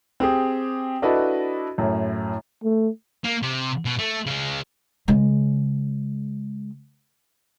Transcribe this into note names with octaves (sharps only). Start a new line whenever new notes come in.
C4 G4 G#4
D4 E4 F#4 A4 B4 D#5
F#2 A2
A3
A#3
C3
B2
A3
C#3 G#3
C#3 G#3